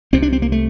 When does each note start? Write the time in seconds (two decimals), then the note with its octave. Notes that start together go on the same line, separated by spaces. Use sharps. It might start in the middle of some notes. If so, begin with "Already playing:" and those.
0.13 C2 C3 C4
0.22 D4
0.32 C4
0.42 A#3
0.52 A3